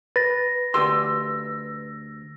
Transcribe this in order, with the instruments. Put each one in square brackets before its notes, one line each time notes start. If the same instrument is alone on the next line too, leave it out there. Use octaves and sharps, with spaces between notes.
[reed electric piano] B4 [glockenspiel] A6 A#6
[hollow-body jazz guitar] D2 G4 C6 [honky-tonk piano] E6